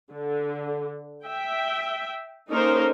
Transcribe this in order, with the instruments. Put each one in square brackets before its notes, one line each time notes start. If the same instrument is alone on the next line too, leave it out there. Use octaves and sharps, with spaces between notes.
[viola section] D3
E5 G5
A#3 C#4 D#4 A4 A#4 C5